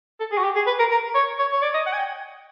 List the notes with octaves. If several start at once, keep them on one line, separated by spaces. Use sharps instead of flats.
A4
G#4
F#4
G4
G#4
B4
A#4
A#4
C#5
C#5
C#5
D5
D#5
F#5
G#5
G5